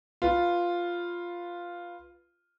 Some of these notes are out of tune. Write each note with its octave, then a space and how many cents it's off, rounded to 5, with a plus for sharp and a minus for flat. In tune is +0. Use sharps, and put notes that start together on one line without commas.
F4 +0 B4 +0